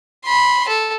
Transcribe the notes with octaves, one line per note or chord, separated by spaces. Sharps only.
B5 C6
A4